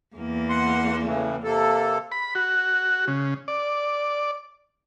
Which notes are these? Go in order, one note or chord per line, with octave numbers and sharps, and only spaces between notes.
E2 A#3
F#5 C6
A2 C#3 E3
C3 A#3 A4
B5
F#4
C#3
D5